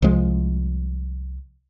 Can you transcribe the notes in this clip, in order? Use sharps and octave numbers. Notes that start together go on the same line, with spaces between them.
C2 F3 G#3